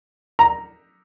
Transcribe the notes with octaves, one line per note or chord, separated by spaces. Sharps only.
A#5